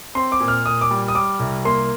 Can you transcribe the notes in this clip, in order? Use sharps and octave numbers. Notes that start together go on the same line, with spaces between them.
C4 C6
D6
A#2
F6
A#2 D#6
D6
G3
D#6
G3 D6
C2
A#3 C6